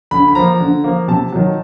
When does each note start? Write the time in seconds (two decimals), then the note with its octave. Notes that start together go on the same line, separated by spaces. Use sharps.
0.11 D3 B5
0.28 B5
0.35 F3 A#3 A#5
0.60 D3
0.84 F3 A#3
1.08 C3 A5
1.33 D#3 F#3